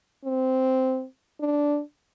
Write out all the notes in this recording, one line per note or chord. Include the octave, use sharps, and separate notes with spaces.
C4
D4